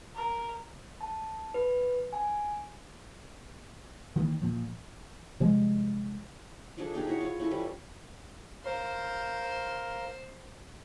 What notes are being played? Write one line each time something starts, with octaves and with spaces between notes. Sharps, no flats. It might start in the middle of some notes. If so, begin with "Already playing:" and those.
A#4
A5
B4
G#5
D#3 E3 A#3
A#2 F3
C3 F3 G3 G#3
F3 D4 G#4 A4
D4 D#4 G4 G#4
E4 F#4 C#5
F4 C#5
C#4 E4 A4
F3 G3 E4 B4
A#4 C5 F5